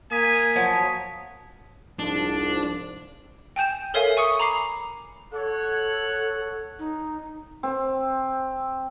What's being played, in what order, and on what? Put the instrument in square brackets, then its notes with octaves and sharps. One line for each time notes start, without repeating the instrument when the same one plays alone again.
[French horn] A#3 [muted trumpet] G#5 [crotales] D#6 B6
[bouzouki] F3 F#3
[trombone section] C2 G#2 F3 [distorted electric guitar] D4
[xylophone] G5 G#5 G6 E7
A4 A#4 C#5 E5 F5 G#5
G#5 C#6 D#6 C#7
A#5 B5 D6 C7
[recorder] A4 [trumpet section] C#5 F#5
[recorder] D#4
[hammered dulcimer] C4